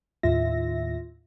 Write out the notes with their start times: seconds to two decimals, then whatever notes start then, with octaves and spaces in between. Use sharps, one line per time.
0.23 D#2 A2 F4 E5 A#6